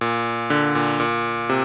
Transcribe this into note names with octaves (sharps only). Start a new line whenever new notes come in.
A#2
D3
A#2
A#2
C3